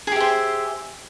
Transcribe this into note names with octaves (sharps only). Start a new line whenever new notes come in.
G4 G#4 C5 E5